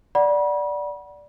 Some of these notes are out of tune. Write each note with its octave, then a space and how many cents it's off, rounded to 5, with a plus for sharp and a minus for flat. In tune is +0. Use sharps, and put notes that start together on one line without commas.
D5 +0 F#5 +5 B5 -35